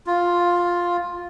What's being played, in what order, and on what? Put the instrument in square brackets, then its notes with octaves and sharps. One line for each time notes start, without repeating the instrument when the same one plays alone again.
[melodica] F4